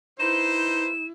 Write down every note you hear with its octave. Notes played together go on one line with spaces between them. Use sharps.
D#4 E4 B4 C5 E7